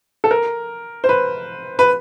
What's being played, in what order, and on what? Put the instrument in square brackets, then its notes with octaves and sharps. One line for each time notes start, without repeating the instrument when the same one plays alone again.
[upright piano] A4
A#4
C5
B4
B4